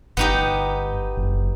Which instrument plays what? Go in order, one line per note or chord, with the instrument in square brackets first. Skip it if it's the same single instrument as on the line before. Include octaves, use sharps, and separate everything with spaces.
[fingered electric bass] G1 [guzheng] B3 D#4 G4
[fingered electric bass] F#1